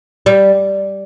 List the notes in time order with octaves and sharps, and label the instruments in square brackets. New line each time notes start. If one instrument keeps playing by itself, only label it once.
[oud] G3